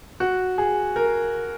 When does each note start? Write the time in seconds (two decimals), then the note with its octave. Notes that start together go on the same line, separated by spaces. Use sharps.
0.20 F#4
0.58 G#4
0.96 A#4